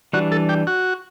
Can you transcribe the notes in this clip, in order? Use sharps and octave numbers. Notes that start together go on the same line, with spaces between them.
E3 G3 D4 F#4
A4
G4
F#4